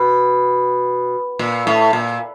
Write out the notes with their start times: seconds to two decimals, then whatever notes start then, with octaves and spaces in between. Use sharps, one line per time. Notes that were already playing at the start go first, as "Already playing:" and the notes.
Already playing: B2
1.39 A#2
1.67 A2
1.93 A#2